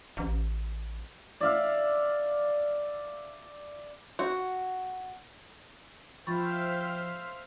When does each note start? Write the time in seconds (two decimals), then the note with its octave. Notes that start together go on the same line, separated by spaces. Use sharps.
0.17 A1
1.41 D5 E5 F5
4.19 F#4
6.27 F3 C5 E5 F5 G5 B5 C#6 A6